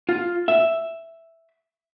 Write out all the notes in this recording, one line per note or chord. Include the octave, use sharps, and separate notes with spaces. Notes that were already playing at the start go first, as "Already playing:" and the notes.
F4
E5